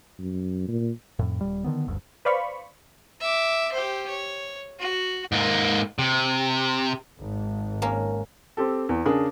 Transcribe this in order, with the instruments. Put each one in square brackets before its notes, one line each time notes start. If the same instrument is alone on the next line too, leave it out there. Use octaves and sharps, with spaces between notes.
[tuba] F#2
A#2
[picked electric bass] F2 A2
D#1 G3
D3 D#3 F#3 B3
F#1 D2 G2
[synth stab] B4 C5 D5 F5 B5 C#6
[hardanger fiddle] E5 D6
G4 C5
C#5
F#4
[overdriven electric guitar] G#2 A#3
C3
[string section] G#1
[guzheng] A#3 C#4
[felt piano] C4 G4 A4
E2
C#3 D4 G#4 A#4